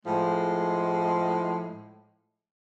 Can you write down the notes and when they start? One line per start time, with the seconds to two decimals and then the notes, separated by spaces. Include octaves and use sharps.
0.06 A2 F3 G#3